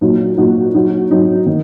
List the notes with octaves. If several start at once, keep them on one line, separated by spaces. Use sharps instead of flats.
A#2 F#3 D#4 F#4
A#2 F#3 D#4 F#4
F#3 D#4 F#4
F#3 D#4 F#4
D#3